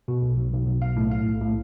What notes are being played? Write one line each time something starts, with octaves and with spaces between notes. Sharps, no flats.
B2
B1
B1
B1
B1
B1 F5
A2
A2 F5
B1
A2